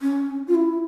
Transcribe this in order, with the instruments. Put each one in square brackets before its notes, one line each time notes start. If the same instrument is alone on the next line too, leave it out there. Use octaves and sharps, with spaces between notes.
[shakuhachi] C#4
F4
E4